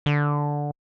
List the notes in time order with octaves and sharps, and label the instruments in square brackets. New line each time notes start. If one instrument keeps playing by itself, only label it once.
[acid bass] D3